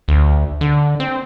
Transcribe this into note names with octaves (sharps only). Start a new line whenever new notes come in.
D2
D3
C4